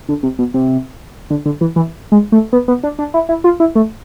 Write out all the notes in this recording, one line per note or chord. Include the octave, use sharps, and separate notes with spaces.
D3
C3
B2
C3
D3
D3
E3
E3
G#3
A3
B3
B3
D4
D4
E4
E4
F4
E4
A3